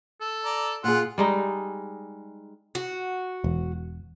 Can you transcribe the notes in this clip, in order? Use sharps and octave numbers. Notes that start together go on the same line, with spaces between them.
A4
D5 A#5
A#2 F4 G#4 F#5
G3 G#3 D#4
F#4
E1